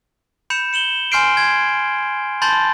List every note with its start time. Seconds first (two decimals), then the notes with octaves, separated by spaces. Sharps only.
0.50 B5 G6 C#7 E7 F7
0.73 C#7 E7 F#7 G7
1.12 G#5 C6 F6 G6 C7 D7
1.37 G#6
2.42 A5 B5 C6 G6 A6